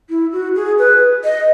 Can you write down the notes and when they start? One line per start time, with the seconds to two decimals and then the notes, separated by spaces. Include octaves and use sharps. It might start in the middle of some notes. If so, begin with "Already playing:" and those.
0.10 E4
0.32 F#4
0.56 G#4
0.78 B4
1.24 D#5